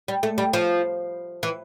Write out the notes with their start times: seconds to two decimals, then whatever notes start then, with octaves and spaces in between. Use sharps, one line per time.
0.08 G3
0.23 A3
0.38 G3
0.53 F3
1.43 E3